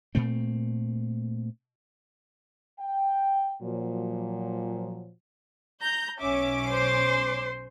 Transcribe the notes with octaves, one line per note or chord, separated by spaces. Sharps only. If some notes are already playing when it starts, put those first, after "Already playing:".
A#2 A3 C4
G5
A#2 F3 F#3
A#5 G6
B1 C#4 E5 D6
C5 C6